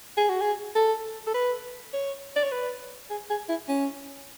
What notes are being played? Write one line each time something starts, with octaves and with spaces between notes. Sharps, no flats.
G#4
F#4
G#4
A4
A4
B4
C#5
D5
C#5
B4
G#4
G#4
E4
C#4